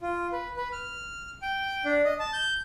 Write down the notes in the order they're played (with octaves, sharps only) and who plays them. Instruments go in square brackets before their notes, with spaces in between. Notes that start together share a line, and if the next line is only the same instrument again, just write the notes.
[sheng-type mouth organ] F4
B4
B4
F6
G5
D4
D#5
A5
G6